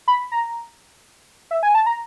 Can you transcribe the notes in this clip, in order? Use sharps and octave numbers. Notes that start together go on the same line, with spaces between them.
B5
A#5
E5
G#5
A5
A#5